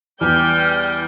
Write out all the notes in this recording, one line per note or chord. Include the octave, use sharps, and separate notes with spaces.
E2 G3 G5 F6 G6